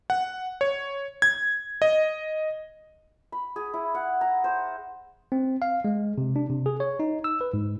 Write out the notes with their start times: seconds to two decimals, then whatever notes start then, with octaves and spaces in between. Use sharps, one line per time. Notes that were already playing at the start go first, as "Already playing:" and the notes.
0.10 F#5
0.61 C#5
1.22 G#6
1.82 D#5
3.32 B5
3.56 G#4
3.74 E4
3.95 F#5
4.21 A#5
4.44 C5
5.32 C4
5.62 F5
5.85 G#3
6.18 C3
6.36 D4
6.50 C3
6.66 G#4
6.80 C#5
7.00 D#4
7.24 E6
7.41 B4
7.54 G#2